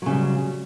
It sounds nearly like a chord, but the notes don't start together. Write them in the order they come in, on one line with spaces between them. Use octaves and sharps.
F#3 C#3 G3